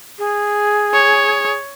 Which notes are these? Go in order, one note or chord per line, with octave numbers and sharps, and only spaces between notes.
G#4
C#5